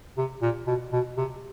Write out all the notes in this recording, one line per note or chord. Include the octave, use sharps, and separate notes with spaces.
C3
A#2
B2
B2
C3